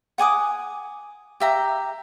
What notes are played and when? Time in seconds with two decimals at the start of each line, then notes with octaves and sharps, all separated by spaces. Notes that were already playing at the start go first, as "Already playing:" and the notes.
0.18 F#5 G#5 D6 D#6
1.40 G4 E5 A#5